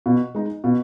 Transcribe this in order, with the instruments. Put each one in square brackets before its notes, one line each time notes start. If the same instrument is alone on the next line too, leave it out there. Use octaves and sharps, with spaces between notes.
[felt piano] B2
G#3 D#4
B2